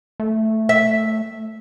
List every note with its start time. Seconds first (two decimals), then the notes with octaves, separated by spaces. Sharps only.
0.20 A3
0.69 E5